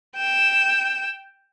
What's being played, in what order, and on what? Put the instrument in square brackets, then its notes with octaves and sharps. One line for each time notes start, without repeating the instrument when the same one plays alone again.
[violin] G5 E7